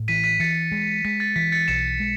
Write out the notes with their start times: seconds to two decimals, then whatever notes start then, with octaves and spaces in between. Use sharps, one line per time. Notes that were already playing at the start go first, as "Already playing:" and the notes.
Already playing: A2
0.08 E3 B6 D#7
0.24 B6 D#7
0.40 E3 A6 C#7
0.72 G#3
1.05 G#3 B6
1.20 A6
1.36 E3 B6
1.52 A6 C#7
1.68 B1 C#7 E7
2.00 G#3